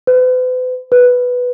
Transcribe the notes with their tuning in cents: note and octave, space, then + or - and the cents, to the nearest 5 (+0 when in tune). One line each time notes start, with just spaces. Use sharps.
B4 +40
B4 +0